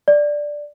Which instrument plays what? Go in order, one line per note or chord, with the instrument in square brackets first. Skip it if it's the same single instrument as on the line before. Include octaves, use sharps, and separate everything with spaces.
[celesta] D5